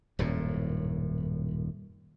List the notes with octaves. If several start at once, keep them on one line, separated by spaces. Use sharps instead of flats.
D#1 F#2 A2